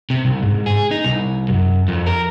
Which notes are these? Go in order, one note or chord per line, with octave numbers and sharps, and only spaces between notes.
C3
C2
G#2
G#4
D#4
C2
F#2
F2
A#4